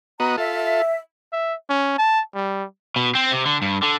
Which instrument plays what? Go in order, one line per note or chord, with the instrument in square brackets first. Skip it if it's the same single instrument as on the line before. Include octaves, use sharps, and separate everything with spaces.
[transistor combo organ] B3 F#4 D#5 [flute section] A#5
[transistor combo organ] F4 A4 [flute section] E5
[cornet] E5
C#4
A5
G3
[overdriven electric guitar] B2
C4
C3
D3
G2
D3